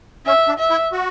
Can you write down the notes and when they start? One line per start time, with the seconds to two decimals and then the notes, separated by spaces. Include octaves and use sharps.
0.26 C#4 E5
0.47 D4
0.59 E5
0.70 E4
0.92 F#4